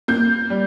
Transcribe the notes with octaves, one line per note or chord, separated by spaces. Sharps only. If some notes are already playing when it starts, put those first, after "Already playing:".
A#3 G6
G3